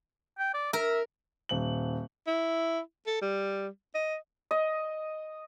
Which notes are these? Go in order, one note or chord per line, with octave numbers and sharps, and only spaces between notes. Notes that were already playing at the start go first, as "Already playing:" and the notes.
G5
D5
A#4 E5
D#1 F#7
E4
A4
G3
D#5
D#5